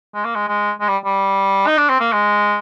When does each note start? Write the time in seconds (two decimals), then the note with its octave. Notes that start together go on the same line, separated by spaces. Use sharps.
0.14 G#3
0.25 A#3
0.35 G#3
0.48 G#3
0.80 G#3
0.88 G3
1.05 G3
1.67 D#4
1.77 D4
1.89 C4
2.00 A#3
2.13 G#3